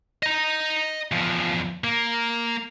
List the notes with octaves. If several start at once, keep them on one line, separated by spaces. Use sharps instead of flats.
D#5 A#5
E2 F3
A#3